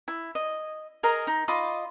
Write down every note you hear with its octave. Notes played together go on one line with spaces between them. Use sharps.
E4
D#5
G#4 A#4 D#5 A#5
D#4
F4 D#5 B5 D6